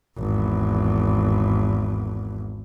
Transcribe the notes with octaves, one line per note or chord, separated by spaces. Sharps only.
G#1 E2